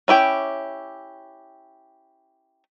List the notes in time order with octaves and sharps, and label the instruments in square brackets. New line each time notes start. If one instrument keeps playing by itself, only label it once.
[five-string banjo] C#4 E4 G4 G5